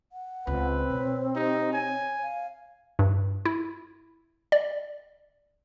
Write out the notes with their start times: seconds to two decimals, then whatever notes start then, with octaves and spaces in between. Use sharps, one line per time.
0.12 F#5
0.47 C#2 C4 B4
0.90 B2 C#5
1.35 D#4 G4
1.73 C#5 G#5
2.23 F5
2.99 G2
3.46 E4
4.52 D5